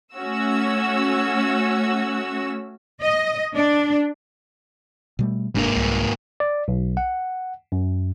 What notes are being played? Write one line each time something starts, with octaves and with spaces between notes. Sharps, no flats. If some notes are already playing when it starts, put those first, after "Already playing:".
A3 C#4 F#4 E6
D#5
D4
B2 G3 A3
F#1 G#2 A#3 D4
C2
D5
B1
F#5
F#2